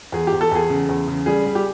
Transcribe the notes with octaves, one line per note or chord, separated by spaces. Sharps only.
E2 G#4
G4
E2
A4
E2 G#4
C#3
E2
C#3
G3 G#4
G3
G4